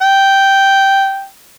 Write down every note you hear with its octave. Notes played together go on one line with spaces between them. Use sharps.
G5